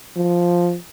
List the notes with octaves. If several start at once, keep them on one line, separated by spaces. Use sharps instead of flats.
F3